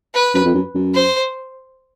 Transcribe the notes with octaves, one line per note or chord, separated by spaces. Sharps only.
B4
F#2
F2
F#2
F#2
C5